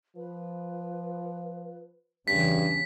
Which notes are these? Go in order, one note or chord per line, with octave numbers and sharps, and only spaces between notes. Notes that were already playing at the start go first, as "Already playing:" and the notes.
F3 B4
E2 G2 C#3 E3 C#4 B6